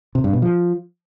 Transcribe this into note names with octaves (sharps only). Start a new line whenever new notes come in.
C3
G2
B2
F3